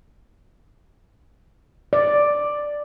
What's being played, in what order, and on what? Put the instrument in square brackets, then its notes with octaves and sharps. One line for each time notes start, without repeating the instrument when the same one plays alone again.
[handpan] D5